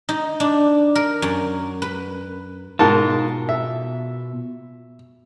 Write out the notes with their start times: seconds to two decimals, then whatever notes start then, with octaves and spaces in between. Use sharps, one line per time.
0.09 D#4
0.40 D4
0.95 A#4
1.22 F#2
1.82 B4
2.79 G#2 B2 F4 A#4 A5
3.49 E5